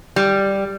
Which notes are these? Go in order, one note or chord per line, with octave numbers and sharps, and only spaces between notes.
G3